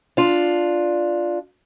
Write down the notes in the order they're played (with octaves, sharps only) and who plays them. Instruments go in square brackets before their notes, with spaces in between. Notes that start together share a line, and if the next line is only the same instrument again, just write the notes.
[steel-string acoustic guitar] D4 F4